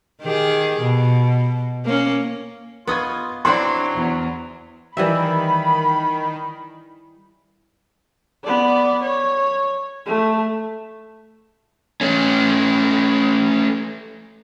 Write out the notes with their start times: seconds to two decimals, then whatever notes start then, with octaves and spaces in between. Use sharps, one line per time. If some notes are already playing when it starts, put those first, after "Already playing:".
0.22 D#3 G4 G#4
0.80 B2
1.85 A#3 C#4
2.87 B3 F4 D#5 C#6 D#6 G#6
3.45 F#3 C4 D4 E4 F#4 C6
3.95 E2
4.97 D#3 E3 G3 E5 B5
8.44 B3 D5
9.02 C#5
10.06 A3
12.01 A3 C#4